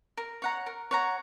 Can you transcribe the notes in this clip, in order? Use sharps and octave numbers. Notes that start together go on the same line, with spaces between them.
A#4
C#5 F#5 A#5
A#4
C#5 F#5 A#5